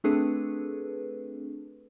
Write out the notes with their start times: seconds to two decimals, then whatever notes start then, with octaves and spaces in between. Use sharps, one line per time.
0.04 A3 C4 D4 G#4 A4 B4